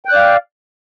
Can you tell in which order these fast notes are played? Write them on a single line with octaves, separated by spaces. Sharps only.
G5 F#6 D5 F5